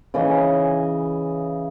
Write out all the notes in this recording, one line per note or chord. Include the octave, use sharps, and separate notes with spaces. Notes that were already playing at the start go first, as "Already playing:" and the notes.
C#3 E3 D#5 G#5